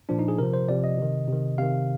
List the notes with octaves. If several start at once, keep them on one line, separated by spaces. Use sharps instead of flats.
A#2 F3 D4
D#4
G#4
C3 F3 A#4
C5
C3 F3 D5
D#5
C3 D#3
C3 D#3
C3 D#3 F5